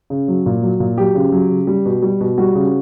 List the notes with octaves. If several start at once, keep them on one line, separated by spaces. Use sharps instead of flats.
C#3
F#3
A#2
F#3
A#2
F#3 G4
C#3
F#3
C#3
G3
B2
G3
B2
G3 F#4
C#3